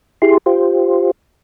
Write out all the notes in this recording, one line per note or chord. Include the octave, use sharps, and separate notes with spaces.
E4 G4 G#4 C6
F4 G4 C5